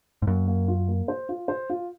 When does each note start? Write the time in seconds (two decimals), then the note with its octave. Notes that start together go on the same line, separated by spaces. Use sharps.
0.22 G#2
0.27 F#2 A#3
0.47 A#3
0.68 F4
0.88 A#3
1.08 C5
1.29 F4
1.48 C5
1.70 F4